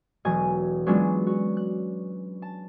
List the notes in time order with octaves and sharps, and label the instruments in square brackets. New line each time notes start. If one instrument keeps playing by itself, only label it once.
[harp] E1 F#3 D#5 G#5
F#3 G#3 B3 C#4 D4 F4
F#4
F#6
A5